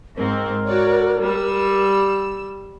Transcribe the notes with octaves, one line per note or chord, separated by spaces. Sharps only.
G#2 C4 A#4
F#4 C#5 D5
G3 E6